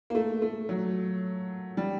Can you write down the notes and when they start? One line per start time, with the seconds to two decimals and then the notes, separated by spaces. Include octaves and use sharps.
0.10 A#3
0.15 A3
0.42 A3
0.69 F#3
1.77 G3